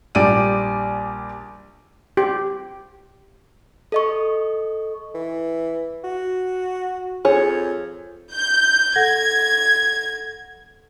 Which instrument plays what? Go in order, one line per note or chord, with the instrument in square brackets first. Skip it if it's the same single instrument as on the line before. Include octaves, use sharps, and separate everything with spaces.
[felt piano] A#1 G3 G4 D5 D7 D#7
[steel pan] G4
[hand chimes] A4 D#5 C#6
[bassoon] E3
F#4
[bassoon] F2 [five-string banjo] G#4 C#5
[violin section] G6
[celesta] A4 F#5 A#6 [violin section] G#6